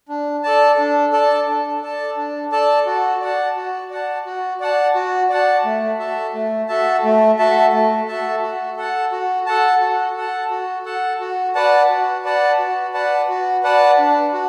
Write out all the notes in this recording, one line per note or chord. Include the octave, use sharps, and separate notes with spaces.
D4
A4 D5 A5
D4
A4 D5 A5
D4
A4 D5 A5
D4
A4 D5 A5
F#4
D5 F#5 A5
F#4
D5 F#5 A5
F#4
D5 F#5 A5
F#4
D5 F#5 A5
A3
F#4 A4 E5 A5
A3
F#4 A4 E5 A5
A3
F#4 A4 E5 A5
A3
F#4 A4 E5 A5
F#4
A4 F#5 A5
F#4
A4 F#5 A5
F#4
A4 F#5 A5
F#4
A4 F#5 A5
F#4
B4 D5 F#5 A5
F#4
B4 D5 F#5 A5
F#4
B4 D5 F#5 A5
F#4
B4 D5 F#5 A5
D4
F#4